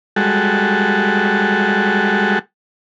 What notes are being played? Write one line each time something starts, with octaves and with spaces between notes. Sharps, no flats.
G3 G#3 F#4 A4